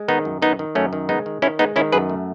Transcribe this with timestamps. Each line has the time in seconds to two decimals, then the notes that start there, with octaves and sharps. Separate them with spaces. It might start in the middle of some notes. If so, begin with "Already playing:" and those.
Already playing: G#3
0.08 D#3 B3 D#4
0.25 F#2
0.42 D#3 B3 D#4
0.59 D#3
0.75 F#2 A3 C#4
0.93 D#3
1.09 G#3 B3 D#4
1.26 D#3
1.42 D#3 C#4 E4
1.59 G#3 B3 D#4
1.76 D#3 C#4 E4
1.92 F#2 G#4 B4
2.10 A3